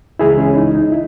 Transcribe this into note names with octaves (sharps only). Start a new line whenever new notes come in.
C#2 C#3 E3 G#3 E4 G#4
C#4 E4
D#4
D#4
E4